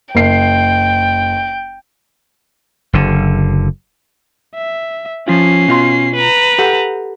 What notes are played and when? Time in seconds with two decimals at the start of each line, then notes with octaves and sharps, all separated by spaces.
0.15 F#1 G5 C7
2.93 F#1 D3
4.55 E5
5.28 F3 C#4 F4 C7
5.68 B2 F4 C6
6.15 B4 A#5
6.58 G4 A4 F#5